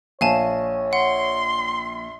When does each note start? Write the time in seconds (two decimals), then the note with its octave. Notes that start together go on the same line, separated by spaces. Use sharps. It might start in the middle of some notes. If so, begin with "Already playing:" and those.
0.21 A#1 C#5 F5 G#5 A5
0.93 F#5 C6